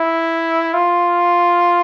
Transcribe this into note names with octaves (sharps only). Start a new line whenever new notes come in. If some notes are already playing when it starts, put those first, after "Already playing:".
Already playing: E4
F4